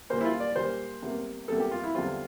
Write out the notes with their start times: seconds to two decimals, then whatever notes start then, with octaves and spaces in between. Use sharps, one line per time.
0.10 A#2 G3 A#3 C5
0.21 E4
0.25 F4
0.40 D5
0.56 A#2 G3 A#3 C5
1.02 E2 C3 G3 A#3
1.48 E2 C3 G3 A#3 A4
1.60 G4
1.71 F4
1.84 E4
1.95 E2 D3 G3 C4 F4